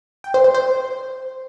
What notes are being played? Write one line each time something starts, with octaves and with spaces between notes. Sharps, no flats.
G5
C5
C5
C5